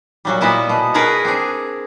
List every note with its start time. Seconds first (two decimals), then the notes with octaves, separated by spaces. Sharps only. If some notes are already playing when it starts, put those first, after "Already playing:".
0.25 A#2 F#3 G3
0.41 A#2 B3 E4 D#5
0.69 B2
0.94 G#4 A#4 B4 C#5 F#5 A#5
1.25 C4 D4 G#4